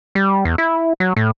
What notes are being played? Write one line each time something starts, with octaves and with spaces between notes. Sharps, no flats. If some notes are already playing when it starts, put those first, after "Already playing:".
G3
E2
E4
F#3
A2